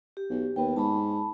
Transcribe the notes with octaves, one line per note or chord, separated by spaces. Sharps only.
G4
B1
D#2 B3 B4 G5
G#2 A5 B5